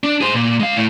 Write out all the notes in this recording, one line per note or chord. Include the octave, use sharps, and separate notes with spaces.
D4
G#4 C5
A#2
G#3 F5
A2